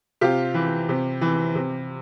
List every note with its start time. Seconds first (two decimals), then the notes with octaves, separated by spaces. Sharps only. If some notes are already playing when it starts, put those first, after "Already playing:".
0.21 C3 F4 G4
0.54 E3
0.89 C3
1.21 E3
1.55 C3